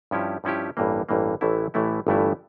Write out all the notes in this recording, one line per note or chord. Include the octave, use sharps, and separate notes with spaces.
G2 F3 C#4 E4 G4
G2 F3 C#4 E4 G4
A1 G2 E3 A#3
A1 G2 E3 A#3
A1 A2 E3 A3 E4
A1 A2 E3 A3 E4
G1 G2 E3 A3 E4